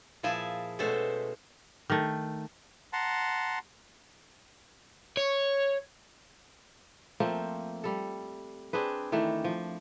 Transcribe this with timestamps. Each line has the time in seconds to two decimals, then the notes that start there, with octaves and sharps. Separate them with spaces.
0.23 A#2 F3 E4 G#4 G#5 A5
0.79 B2 G#3 A3 C#4 A4 C5
1.90 D#3 A3
2.93 F#5 A5 A#5 C6
5.17 C#5
7.20 F3 A3 A#3 C4
7.84 G3 A4
8.73 C4 D4 G#4 B4
9.12 D#3 E3 A3 D4
9.44 F3